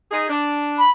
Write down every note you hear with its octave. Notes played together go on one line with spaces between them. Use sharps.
D#4 G#4
D4
B5